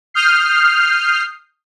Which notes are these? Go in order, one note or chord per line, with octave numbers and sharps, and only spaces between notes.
D#6 F6 G6 C7